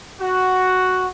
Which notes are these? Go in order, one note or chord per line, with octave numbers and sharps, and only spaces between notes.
F#4